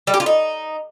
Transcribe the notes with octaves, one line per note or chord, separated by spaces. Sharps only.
G3
G4
F4
D#4